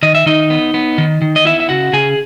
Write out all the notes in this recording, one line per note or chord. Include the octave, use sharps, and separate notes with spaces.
D#3 D#5
E5
D#3 D#4 D#5
B3
B3
D#3
D#3
D#5
B3 E4 E5
E5
C#3 F#4 F#5
C#3 G#4 G#5